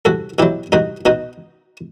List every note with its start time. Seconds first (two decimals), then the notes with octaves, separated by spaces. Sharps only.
0.05 C2 F#4 A4
0.39 B2 F#3 E4 G4
0.72 C2 D#4 F#4
1.05 B2 D#4 F#4